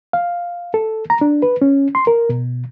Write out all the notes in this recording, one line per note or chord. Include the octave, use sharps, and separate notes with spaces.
F5
A4
A#5
D4
B4
C#4
C6
A#4
B2